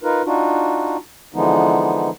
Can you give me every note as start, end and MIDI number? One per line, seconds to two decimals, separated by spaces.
0.03 0.22 63
0.03 0.22 65
0.03 0.22 70
0.03 0.22 71
0.26 0.97 62
0.26 0.97 63
0.26 0.97 65
0.26 0.97 66
1.34 2.10 50
1.34 2.10 52
1.34 2.10 53
1.34 2.10 56
1.34 2.10 59
1.34 2.10 63